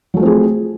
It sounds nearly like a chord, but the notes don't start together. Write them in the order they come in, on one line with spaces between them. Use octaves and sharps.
F#3 A3 F3 C4 G#4